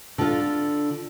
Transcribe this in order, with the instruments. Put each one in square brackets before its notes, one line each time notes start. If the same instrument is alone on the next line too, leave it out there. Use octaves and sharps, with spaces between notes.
[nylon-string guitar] D3 F4